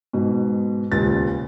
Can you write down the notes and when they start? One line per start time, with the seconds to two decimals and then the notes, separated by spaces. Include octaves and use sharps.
0.13 G#2 B2
0.91 D#1 C#2 A6